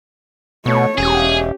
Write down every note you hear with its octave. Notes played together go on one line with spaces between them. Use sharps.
B2 A3 C#5
E1 C#4 G4 G#4